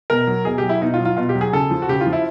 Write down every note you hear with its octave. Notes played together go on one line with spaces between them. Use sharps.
B2 A#4
F#3
B2 G#4
F#3 G4
E4
B2 D#4
F4
F#3
F4
B2 F4
G4
F#3
G#4
C#3 A4
F3
F#4
C#3 G4
F4
F3
E4